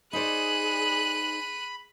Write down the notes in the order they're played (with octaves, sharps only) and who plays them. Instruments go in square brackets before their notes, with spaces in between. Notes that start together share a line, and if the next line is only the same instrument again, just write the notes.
[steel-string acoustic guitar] D#4 C5 D5 [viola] G#4 [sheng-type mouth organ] B5 [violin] F#6 D#7